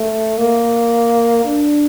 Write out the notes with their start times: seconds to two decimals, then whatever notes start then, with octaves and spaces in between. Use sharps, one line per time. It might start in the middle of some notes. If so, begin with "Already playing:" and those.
Already playing: A3
0.37 A#3
1.45 D4